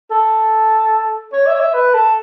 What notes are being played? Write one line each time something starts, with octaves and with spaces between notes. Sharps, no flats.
A4
C#5
E5
C#5
E5
B4
A4